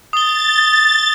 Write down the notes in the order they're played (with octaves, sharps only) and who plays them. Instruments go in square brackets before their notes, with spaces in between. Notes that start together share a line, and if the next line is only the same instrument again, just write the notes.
[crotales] D#6 G7 [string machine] A6